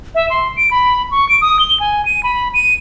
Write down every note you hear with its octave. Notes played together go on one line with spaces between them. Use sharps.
E5
C6
D7
B5
C#6
D7
D#6
G7
G#5
D#7
B5
D#7